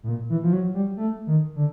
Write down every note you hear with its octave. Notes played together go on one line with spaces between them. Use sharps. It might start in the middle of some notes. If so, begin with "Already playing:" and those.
A2
A#2
E3
F3
F#3
G3
A3
D#3
D3